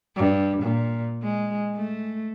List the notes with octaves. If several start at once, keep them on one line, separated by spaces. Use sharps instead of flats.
G2
A#2
G#3
A3